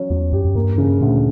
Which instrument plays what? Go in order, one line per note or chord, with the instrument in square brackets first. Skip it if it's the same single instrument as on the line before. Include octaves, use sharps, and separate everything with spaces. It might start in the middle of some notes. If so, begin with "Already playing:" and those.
Already playing: [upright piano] F#3 C#4
[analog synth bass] E2 [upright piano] F#3
[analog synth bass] F#2 [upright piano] G4
[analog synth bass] F#2
[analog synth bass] G2 [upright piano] A#3
[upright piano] C#3
[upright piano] D2 [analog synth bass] A#2